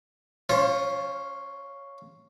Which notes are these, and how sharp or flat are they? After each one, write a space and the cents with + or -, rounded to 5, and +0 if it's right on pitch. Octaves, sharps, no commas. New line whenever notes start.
C#4 +0 F4 +0 C5 +45